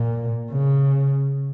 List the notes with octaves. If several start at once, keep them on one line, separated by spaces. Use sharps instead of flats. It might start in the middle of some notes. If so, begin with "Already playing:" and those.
Already playing: A#2
C#3